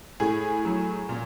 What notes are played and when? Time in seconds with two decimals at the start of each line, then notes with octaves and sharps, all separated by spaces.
0.20 A2 G#4
0.65 F#3
1.09 A#2